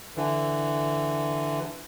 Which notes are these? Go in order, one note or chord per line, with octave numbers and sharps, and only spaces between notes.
D3 E3